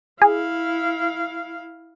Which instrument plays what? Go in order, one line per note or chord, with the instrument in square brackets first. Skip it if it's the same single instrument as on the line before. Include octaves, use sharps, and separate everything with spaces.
[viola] E4 F5 [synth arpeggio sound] G#4